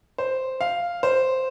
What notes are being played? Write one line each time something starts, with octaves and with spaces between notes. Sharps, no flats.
C5
F5
C5